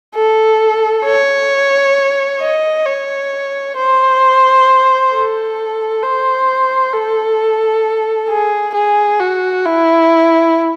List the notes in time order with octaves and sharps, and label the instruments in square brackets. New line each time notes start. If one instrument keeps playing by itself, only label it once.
[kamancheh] A4
C#5
D#5
C#5
C5
A4
C5
A4
G#4
G#4
F#4
E4